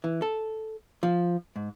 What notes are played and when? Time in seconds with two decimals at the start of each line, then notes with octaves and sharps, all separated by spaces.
0.04 E3
0.22 A4
1.03 F3
1.56 G#2